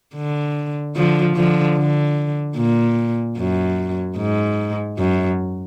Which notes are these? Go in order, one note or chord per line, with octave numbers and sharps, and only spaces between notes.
D3
D3 F3
D3 F3
D3
A#2
F#2
G#2
F#2